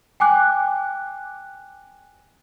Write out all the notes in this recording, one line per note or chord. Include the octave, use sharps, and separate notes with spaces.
G5 G#5 D6 F#6